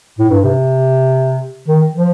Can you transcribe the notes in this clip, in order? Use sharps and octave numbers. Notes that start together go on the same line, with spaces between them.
A2
G2
C3
D#3
F3